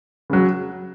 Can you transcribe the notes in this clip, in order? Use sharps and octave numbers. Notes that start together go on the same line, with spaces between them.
C#3 F#3